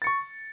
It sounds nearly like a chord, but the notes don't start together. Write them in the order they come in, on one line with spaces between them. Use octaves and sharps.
A6 C#7 C#6